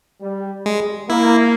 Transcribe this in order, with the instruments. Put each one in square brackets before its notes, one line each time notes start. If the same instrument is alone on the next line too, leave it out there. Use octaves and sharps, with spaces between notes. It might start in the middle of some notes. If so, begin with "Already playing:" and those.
[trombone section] G3
[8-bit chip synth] G#3
[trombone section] A#3 [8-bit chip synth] E4